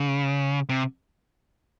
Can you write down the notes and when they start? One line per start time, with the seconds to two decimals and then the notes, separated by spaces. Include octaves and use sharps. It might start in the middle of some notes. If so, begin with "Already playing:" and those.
Already playing: C#3
0.69 C3